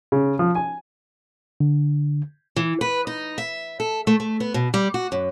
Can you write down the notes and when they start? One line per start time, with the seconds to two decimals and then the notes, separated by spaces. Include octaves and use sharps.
0.12 C#3
0.39 F3
0.55 G#5
1.60 D3
2.56 E3
2.81 B4
3.07 D#4
3.38 E5
3.80 A4
4.07 A3
4.20 A3
4.40 B3
4.54 B2
4.74 G3
4.94 F#4
5.12 F#2